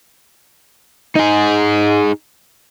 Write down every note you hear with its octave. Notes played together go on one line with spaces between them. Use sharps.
D#4 G#4